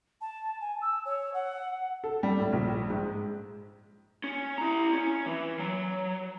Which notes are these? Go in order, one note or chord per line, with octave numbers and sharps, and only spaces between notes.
A5
G#5
E6
C#5
F#5
A4
G3
A2
A#1
G#2
C#4
E4 A#5
C#4
E3
F#3